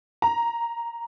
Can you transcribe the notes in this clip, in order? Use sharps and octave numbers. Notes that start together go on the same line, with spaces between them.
A#5